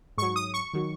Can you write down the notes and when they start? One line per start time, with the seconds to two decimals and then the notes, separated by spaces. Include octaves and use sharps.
0.18 G#2 F#3 C#6
0.36 D#6
0.54 C#6
0.74 D#3 F#3